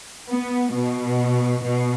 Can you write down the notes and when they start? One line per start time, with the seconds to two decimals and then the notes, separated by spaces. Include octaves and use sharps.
0.29 B3
0.74 B2
1.63 B2